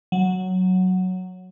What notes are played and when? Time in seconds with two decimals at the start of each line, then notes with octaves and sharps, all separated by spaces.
0.12 F#3